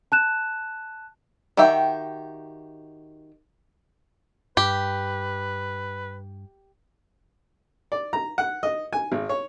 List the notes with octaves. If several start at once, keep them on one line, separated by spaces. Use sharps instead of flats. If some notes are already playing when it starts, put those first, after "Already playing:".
A5 F#6 E7
D#3 F#4 G4 E5 G5
G2 G4 B4
D5
A#5
F#5
D#5
G#5
G#1
C#5